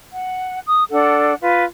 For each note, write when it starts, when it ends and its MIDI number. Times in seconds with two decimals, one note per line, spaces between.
0.12 0.59 78
0.66 0.82 87
0.91 1.34 62
0.91 1.34 69
0.91 1.34 78
1.41 1.64 65
1.41 1.64 71